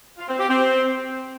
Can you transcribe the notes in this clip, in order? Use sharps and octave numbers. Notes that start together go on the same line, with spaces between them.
F4
C4
G4
C4